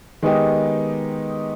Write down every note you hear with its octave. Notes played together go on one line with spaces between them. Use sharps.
D#3 G#3 B3 D#4 G4